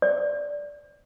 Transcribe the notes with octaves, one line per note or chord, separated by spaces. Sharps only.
D5